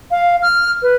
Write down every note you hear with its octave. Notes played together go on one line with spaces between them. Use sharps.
F5
F6
B4